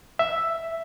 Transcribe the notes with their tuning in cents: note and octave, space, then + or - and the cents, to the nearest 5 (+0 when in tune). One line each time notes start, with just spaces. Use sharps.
E5 +5